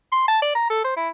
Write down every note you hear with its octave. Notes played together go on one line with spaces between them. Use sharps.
C6
A5
D5
A#5
A4
C5
E4